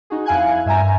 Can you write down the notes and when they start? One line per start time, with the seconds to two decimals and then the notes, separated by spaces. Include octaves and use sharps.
0.10 D#4 F#4 G#4
0.26 F2 E4 F5 G#5 F#6 G#6
0.66 G2 E5 G#5 A#5